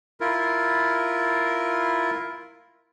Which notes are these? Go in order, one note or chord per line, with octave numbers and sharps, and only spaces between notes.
E4 F4 A#4